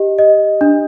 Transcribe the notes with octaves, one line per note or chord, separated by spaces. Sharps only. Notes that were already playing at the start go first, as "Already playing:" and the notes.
Already playing: G4 D#5
D#5
D4